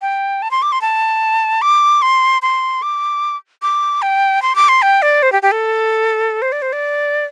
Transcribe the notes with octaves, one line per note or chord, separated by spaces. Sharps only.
G5
A5
C6
D6
C6
A5
D6
C6
C6
D6
D6
G5
C6
D6
C6
G5
D5
C5
G4
G4
A4
C5
D5
C5
D5